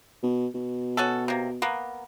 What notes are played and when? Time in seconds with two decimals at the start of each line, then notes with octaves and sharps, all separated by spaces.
0.23 B2
0.54 B2
0.97 C#4 F#4 A4
1.28 C3 A#3
1.62 A#3 B3